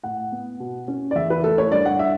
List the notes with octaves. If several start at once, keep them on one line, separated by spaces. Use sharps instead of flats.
A2 F#5
B3
B2
C#4
D5
E2 E5
B4
A3 A4
C#5
G2 D5
F#5
E5